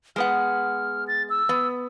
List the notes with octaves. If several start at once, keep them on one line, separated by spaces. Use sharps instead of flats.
G#3 B3 F#5 F6
A6
E6
B3